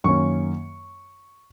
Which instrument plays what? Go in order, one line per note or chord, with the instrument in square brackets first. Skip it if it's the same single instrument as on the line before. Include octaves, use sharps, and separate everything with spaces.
[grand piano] F#2 D#3 A#3 C#4 C#6